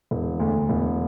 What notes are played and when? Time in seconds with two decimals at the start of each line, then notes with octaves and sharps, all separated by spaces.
0.11 E1
0.39 D2
0.69 E1